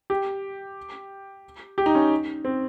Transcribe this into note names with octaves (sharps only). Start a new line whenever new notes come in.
G4
G4
D#4
C#4
C4